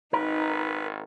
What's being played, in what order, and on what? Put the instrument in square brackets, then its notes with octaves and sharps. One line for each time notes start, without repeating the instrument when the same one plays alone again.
[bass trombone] G#1 [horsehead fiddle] D#4 [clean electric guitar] A#4 [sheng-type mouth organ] B4